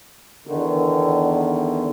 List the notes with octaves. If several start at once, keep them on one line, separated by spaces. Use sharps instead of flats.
E2 D3 D#3